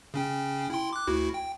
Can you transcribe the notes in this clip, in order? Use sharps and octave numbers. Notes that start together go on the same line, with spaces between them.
C#3 C#4 G5
E4 G5 C6
D6 F#6
D2 E4 F#4
G5